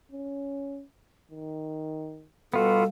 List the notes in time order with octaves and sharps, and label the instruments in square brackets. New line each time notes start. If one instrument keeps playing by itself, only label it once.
[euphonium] C#4
D#3
[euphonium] B2 [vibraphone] G3 F5 [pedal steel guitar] B3 F4 F#4 [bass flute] A4